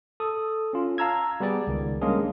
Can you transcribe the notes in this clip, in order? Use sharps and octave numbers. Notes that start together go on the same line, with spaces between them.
A4 D#6
C#4 F4
F5 A5 A#5 E6 G#6
G3 B3 G4 G#4 D5
C#2 D#3
G3 G#3 A#3 C#4 D4 G#4